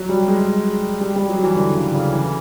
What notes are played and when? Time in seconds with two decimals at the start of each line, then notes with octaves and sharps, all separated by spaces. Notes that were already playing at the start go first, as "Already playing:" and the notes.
Already playing: F#3
0.09 G3
0.28 G#3
1.01 G3
1.16 G3
1.29 F#3
1.43 E3
1.56 D3
1.75 C#3
1.94 C#3
2.12 E3